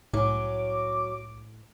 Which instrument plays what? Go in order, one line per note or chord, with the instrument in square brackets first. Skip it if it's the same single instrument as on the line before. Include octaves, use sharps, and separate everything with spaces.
[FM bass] C2 [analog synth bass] A2 [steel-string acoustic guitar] F#3 C#4 [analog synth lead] D6